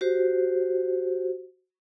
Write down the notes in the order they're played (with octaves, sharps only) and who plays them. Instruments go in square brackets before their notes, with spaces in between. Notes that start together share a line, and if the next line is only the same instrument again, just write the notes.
[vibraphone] F#4 G4 C5